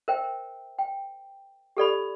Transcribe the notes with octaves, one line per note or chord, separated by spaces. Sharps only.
A#4 C5 E5 G5
G5
G4 A4 D5 B5